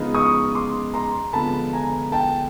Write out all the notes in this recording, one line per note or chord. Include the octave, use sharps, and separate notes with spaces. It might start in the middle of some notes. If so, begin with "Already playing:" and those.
Already playing: C#3 F3 G#3 B3 D#4
C#6 D#6
C6 D6
A#5 C6
D3 F3 G#3 B3 A5 B5
G#5 A#5
G5 A5